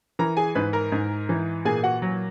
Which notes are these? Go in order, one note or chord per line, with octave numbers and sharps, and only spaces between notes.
E3 A#4 A#5
G#4 G#5
G#2 B4 B5
A#4 A#5
G#2
E3
A#2 G#4 G#5
F#4 F#5
F#3